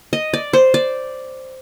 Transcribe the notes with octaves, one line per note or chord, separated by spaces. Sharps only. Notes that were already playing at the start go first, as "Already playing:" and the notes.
D#5
D5
C5
D5